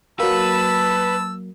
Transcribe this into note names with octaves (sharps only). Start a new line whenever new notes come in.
F#3 A#3 B4 A5 E6